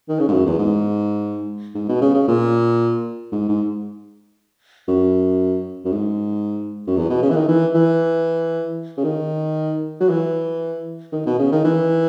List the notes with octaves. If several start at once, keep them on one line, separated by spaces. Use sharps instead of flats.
D#3
C#3
G#2
F#2
E2
G#2
G#2
B2
C#3
C#3
A#2
G#2
G#2
F#2
F#2
G#2
F#2
E2
B2
C#3
E3
D#3
E3
E3
C#3
D#3
F#3
E3
D#3
B2
C#3
D#3
E3